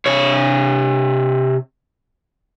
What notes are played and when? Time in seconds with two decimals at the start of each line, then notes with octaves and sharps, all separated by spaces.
0.06 C3 C#5